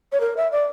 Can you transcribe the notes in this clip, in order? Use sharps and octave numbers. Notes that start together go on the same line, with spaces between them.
C#5
A#4
E5
D5